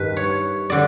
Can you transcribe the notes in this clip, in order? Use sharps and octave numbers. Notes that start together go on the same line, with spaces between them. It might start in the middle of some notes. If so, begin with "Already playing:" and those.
Already playing: G2 D#3 B4
C#5
D3 D5